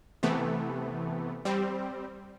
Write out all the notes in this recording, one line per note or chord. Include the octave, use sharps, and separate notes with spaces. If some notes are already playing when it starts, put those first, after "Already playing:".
C3 E3 A3 B3
G3 C4